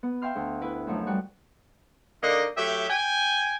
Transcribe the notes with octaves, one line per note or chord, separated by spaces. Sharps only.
B3
E5 F5 G5 C6 F6
D2
E4 B4
F#2 F3 F#3 A3 D#4
G3 F#4
D3 A#3 D#4 D#5
F#3 A3 G4 E5
G5 G#5